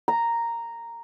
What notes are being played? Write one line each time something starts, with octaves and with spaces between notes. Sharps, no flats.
A#5